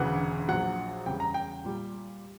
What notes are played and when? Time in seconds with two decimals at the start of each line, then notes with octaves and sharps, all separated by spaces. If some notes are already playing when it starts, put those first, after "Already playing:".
Already playing: E1 D2 C#3 E3 F#5
0.48 A#1 A#2 F#3 F#5
1.06 E2 C#3 G3 G5
1.20 A#5
1.34 G5
1.65 A#2 G3